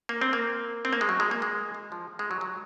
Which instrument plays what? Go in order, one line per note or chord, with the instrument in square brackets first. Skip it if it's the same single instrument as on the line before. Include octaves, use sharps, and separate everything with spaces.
[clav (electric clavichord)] A#3
C4
A#3
C4
A#3
G#3
F#3
G#3
A#3
G#3
G#3
F3
G#3
F#3
F#3